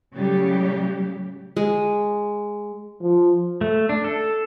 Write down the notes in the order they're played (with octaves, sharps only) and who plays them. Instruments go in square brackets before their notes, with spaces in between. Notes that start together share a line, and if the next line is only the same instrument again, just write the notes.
[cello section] A2 C#3 F#3 G3 G4
[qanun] G#3
[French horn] F3
[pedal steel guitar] A3
D4
A4